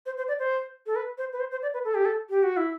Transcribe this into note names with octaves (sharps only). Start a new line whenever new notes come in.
C5
C5
D5
C5
A4
B4
C5
B4
C5
C5
D5
B4
A4
G4
A4
G4
F#4
E4